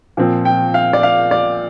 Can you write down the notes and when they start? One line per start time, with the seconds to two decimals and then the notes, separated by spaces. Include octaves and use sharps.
0.17 A#2 F3 C4
0.45 G5
0.74 F5
0.93 D5
1.03 F5
1.31 D5